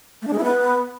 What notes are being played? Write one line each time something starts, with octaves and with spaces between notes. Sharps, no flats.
A3
D4
G#3
E4
B3